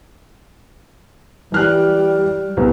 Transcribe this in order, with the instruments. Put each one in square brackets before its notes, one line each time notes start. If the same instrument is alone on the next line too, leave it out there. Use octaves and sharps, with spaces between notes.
[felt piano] E3 F6 F#6 [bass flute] G3
[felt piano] C2 B3